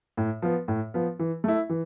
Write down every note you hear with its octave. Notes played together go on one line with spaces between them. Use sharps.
A2
F3 B3
A2
F3 B3
E3
A3 E4
E3